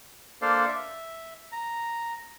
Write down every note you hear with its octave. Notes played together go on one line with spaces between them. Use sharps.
A#3 D4 A4 C5 D5 F5
E5
A#5